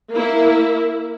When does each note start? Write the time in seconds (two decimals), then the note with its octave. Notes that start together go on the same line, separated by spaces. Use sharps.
0.12 A#3 E4